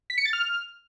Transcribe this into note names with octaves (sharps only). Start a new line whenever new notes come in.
B6
C#7
A6
F6